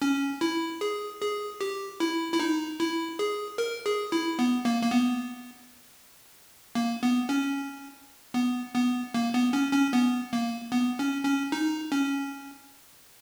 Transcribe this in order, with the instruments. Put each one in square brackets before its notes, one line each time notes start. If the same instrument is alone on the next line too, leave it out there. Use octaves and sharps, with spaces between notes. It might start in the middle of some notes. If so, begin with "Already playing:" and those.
[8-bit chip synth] C#4
E4
G#4
G#4
G4
E4
E4
D#4
E4
G#4
A#4
G#4
E4
B3
A#3
A#3
B3
A#3
B3
C#4
B3
B3
A#3
B3
C#4
C#4
B3
A#3
B3
C#4
C#4
D#4
C#4